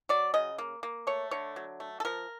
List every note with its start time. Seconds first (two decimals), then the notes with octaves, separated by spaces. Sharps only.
0.09 F#3 D5
0.34 C#3 D#5
0.58 A#3
0.83 A#3
1.07 A3 C#5
1.31 D3 C#5
1.56 F#3
1.80 A3
2.00 A4
2.05 F3 A#4